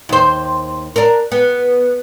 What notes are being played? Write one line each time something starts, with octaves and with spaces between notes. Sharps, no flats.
D#2 C5
D4 A#4
B3